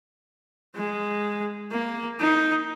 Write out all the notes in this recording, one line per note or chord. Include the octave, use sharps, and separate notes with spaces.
G#3
A#3
D#4